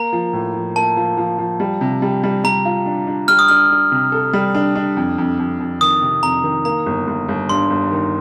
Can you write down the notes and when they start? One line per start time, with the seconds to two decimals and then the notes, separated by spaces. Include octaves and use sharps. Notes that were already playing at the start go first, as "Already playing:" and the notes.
Already playing: A#3 A#5
0.13 F3
0.33 A2
0.54 F3
0.76 A#3 A5
0.97 F3
1.17 F3
1.38 F3
1.60 G3
1.81 C3
2.02 G3
2.24 G3
2.44 G3 A#5
2.65 F4
2.86 D4
3.07 D4
3.28 G3 F6
3.39 D#6
3.48 D4 F6
3.70 D4
3.92 C3
4.12 A4
4.33 G3
4.55 D4
4.76 D4
4.97 F2
5.18 F2
5.39 F2
5.60 F2
5.81 D#3 D#6
6.02 C3
6.23 F2 A#5
6.44 D#3
6.65 A#3 A#5
6.86 G1
7.07 G1
7.28 G1
7.49 G2 C6
7.70 G1
7.92 D#3